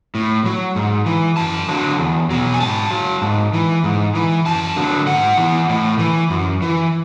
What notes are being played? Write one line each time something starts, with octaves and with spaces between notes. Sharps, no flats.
A2
F#3
G#2
E3
F#2 A5
D3 F#3
E2
B2 F#3
G#5
G#2 A5
F#3
G#2
E3
G#2
E3
F#2 A5
D3 F#3
G#2 F#5
E3
A2
E3
F#2
E3